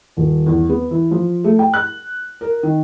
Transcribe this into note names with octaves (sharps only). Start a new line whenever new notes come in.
D#1
E2
B3
E3
F3
A3
G5
F#6
A#4
D#3